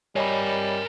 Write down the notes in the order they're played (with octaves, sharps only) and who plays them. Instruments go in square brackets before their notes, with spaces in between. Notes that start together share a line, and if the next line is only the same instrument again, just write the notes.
[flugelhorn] G3 [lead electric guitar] A#4 G#5 [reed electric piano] C#5 D#5 B5